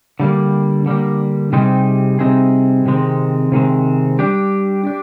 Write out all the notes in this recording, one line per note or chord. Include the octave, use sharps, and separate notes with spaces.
D3 G3 A#3
D3 G3 A#3
C3 G3 C4 D#4 G#4
C3 G3 C4 D#4 G#4
C3 D#3 G#3 C4
C3 D#3 G#3 C4
G3 D4 G4
D4 G4